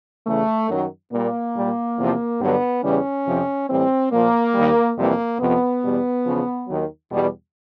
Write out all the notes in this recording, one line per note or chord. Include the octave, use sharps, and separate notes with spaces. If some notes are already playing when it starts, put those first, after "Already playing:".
E2 C#3 E3 A3
F#2 D#3 F#3
A#2 G3 A#3
A#2 G3
E2 C3 F3
G2 D3 F#3 B3
E2 C#3 E3 G3 C#4
F2 C3 F3
A2 E3 G3 C4
A#2 F3 A#3
D#2 D#3 G3
F2 C3 E3 G3 A#3
F2 C3 F3 B3
E2 B2 G3
E2 C#3 F3
D#2 D#3 F#3
E2 B2 G3